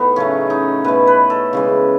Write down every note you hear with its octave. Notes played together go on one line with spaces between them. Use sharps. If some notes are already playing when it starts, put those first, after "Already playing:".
Already playing: A2 B3 D#4
C#3 F#3 A3 C#4
D#4
B2 A3 B4
B4
A4
C#3 E3 G#3